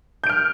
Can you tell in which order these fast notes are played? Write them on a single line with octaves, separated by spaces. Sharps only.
G6 D7 F6